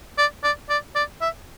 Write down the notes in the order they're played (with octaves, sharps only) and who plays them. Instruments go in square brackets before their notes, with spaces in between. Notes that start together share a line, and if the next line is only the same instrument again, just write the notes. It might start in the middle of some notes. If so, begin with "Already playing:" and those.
[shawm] D5
D5
D5
D5
E5